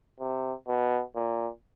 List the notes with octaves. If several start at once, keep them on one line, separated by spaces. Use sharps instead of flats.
C3
B2
A#2